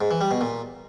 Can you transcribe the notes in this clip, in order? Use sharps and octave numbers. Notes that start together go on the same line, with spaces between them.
G#2
E3
G3
B2
A#2